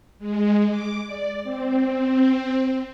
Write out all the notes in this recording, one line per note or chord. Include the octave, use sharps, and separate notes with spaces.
G#3
D6
D5
C4